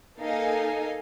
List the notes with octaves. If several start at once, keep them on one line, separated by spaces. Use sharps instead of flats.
A#3 D#4 A4 D#5 F5 G#5